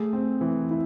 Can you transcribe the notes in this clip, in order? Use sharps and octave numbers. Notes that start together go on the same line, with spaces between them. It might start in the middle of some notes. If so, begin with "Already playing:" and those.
Already playing: A3 G#4
C4
E3
E4